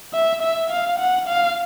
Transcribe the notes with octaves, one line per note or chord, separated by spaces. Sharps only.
E5
E5
F5
F#5
F5